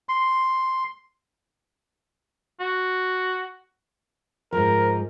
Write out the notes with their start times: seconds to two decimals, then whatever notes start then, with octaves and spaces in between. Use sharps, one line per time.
0.09 C6
2.60 F#4
4.52 G#2 F3 A#4